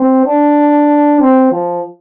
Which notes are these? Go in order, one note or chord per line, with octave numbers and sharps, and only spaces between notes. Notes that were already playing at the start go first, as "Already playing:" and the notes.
Already playing: C4
D4
C4
F3